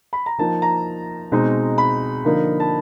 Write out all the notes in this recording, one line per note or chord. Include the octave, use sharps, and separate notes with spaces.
B5
A#5
F3 A#3 D#4 A5
A#5
B2 G#3 C4 D#4
B5
D3 F3 A#3 D#4
A5